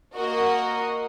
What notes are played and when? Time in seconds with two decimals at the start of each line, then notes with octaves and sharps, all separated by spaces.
0.15 A#3 F#4 A#4 D#5